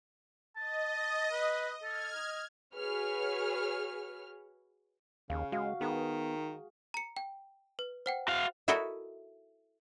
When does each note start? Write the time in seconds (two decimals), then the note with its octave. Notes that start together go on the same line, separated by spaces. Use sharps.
0.56 D#5 A5
1.32 B4
1.83 A4 F6 G#6
2.16 D#5
2.75 F#4 G#4 B4 C#5 F6
5.30 D#2 C#3 F5
5.52 G#3 F#4 F5
5.81 D#3 B3 G#4
6.94 A#5 C#7
7.17 G5
7.79 B4
8.06 C5 F#5 G5
8.28 F#4 F5
8.68 E4 F#4 A4 A#4 D#5 E5